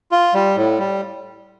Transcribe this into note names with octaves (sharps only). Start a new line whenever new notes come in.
F4
G3
A2
G3